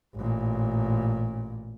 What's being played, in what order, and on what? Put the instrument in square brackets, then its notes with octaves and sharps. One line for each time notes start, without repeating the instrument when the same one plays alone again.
[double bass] A1 A#2